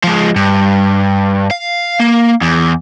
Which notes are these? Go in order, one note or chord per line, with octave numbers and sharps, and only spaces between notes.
F3 G#3
G2
F5
A#3
E2